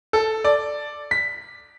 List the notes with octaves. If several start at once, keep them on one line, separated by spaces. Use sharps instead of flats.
A4
D5
B6